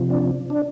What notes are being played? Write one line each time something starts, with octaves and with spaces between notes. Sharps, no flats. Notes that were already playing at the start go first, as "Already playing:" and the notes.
Already playing: C3 F3
D4
D4